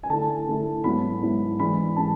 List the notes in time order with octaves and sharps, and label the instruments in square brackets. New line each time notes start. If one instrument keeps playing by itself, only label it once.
[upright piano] G#5
D3 A3 E4 A5
D3 A3 E4
G#2 F#3 B3 E4 B5
G#2 F#3 B3 E4
G#2 E3 G#3 D4 B5
E3 G#3 D4 A5